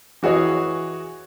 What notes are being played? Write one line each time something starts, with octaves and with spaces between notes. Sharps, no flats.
E3 F#4 G#4 C#5 D#5